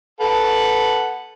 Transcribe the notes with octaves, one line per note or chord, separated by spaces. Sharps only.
A4 B4 F#5